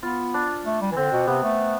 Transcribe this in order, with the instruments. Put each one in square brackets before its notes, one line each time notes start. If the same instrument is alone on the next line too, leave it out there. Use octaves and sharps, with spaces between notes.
[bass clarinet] B3 [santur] F4
[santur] D4
[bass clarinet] A3
G3
E3
[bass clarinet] D3 [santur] C4
[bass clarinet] B2
[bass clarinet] C3 [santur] B3
[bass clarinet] A3